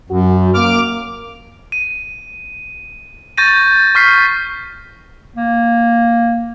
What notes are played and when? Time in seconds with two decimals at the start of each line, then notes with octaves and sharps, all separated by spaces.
0.10 F#2 F#4
0.54 A#3 D6 F6
1.72 D#7
3.37 C#6 G6 A6 A#6 D#7
3.95 C#6 F6 B6 C7
5.36 A#3